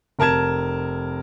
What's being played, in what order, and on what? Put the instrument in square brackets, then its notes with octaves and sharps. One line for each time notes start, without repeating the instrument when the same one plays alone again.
[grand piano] F1 A#4 A5 G#6 E7